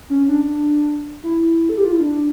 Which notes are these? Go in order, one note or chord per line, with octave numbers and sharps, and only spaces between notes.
C#4
D4
E4
A4
G4
F4
E4
D4